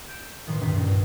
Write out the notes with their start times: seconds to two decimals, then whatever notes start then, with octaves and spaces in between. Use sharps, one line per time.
0.08 G6 D7 E7
0.47 B1 A2 D#3 F#3 A#3 C6
0.61 C#2 G2 D#3 B6
0.74 C#2 G2 A#2